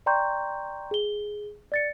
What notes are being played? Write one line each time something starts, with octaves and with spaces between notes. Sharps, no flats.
D5 G5 A#5 C6 C#6 G6
G#4 G7
D5 A6 C#7